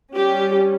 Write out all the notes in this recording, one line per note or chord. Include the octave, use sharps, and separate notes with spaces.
G3 C#4 G4